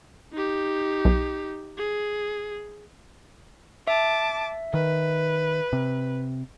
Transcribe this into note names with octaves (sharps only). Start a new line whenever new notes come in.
D#4 G4
B1
G#4
E5 A5 D6
D#3 B4
C3